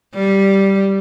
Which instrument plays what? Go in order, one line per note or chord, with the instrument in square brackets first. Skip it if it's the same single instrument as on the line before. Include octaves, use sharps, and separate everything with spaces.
[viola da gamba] G3